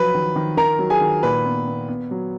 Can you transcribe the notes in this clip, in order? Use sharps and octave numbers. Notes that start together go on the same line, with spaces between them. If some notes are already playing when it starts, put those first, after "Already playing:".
Already playing: F3 F#3 B4 B5
D#3
D#3
D#3 A#4 A#5
F#3
G#4 G#5
D#3
A#2 B4 B5
B3
B3
B3
F#3